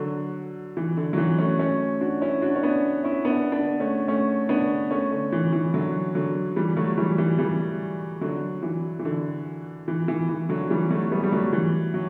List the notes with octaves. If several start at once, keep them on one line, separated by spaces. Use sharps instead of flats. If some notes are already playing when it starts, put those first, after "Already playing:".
Already playing: D3 F#3
E3
D3
F#3
E3
A3 C#4
A3 C#4
D4 F#4
C#4 E4
D4 F#4
C#4
B3 D4
C#4 E4
B3 D4
B3 D4
A3 C#4
A3 C#4
B3 D4
A3 C#4
D3
E3
E3
D3 F#3
D3 F#3
E3 G3
F#3 A3
E3 G3
E3
E3 G3
D3 F#3
E3
E3
D3
E3
E3
E3
D3 F#3
E3 G3
F#3 A3
G3 B3
G3
F#3 A3
E3
F#3